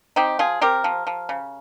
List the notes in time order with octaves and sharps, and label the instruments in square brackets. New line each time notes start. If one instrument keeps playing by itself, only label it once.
[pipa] C4 D#4 G4
F3 F4 G#4
C4 G4 A#4
F3
F3
C#3